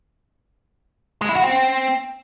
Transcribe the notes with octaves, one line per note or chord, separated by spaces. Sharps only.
G#3
E4
F#4
C4